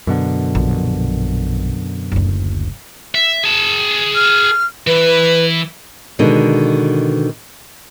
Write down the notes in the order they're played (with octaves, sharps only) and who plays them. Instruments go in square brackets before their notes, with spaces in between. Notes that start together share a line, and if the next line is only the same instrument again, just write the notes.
[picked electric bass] F#2 B2 D3
[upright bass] A#1
F#1 D2
[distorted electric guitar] E5
G#4 A5
[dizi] F6
[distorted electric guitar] E3 [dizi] B4
[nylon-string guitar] B2 D3 D#3 G#3